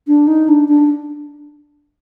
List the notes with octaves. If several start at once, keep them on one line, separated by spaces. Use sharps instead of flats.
D4
D#4
D4
D4